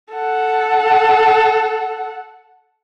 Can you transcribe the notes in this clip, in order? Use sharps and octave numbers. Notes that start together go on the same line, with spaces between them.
A4 F#5